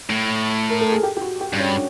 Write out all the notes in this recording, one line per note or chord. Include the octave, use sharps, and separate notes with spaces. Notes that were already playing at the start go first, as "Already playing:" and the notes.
A2
A#4
A4
G#4
G4
G4
F#4
G4
G2 D4
C#4